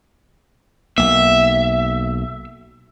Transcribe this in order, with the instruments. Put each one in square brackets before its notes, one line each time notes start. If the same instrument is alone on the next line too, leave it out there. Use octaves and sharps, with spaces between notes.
[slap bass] B1 A#3 [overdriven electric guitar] E5